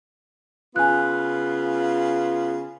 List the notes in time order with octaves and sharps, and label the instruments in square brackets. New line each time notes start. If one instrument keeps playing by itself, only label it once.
[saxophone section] C#3 B3 F4 [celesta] G#5 F#6